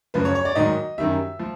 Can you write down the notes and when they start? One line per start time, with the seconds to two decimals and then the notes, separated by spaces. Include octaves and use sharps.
0.14 F#2 C#3 F3 B4
0.25 C#5
0.35 C#5
0.45 D5
0.55 G#2 D#3 F#3 D#5
0.98 F#2 D#3 G3 E5
1.39 F3